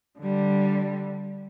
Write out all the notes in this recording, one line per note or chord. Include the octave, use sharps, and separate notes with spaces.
D3 G3